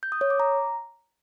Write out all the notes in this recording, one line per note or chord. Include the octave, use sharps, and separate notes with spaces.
G6
D#6
C#5
D6
A#5